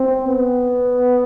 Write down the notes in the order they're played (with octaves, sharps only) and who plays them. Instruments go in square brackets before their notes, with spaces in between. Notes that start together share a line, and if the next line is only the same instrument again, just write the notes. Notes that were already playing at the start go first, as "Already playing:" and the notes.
Already playing: [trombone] C4
B3